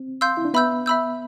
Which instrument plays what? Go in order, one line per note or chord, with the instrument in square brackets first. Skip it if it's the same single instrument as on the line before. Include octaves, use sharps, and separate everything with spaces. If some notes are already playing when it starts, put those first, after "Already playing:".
Already playing: [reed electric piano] C4
[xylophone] F5 C6 E6 G6
[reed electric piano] E4
D4
[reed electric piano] B3 [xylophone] E5 B5 E6 G6
[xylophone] E5 B5 E6 G6